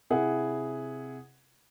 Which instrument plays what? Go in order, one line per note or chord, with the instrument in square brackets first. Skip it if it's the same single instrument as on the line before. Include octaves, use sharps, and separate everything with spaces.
[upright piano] C3 E4 G#4 F#5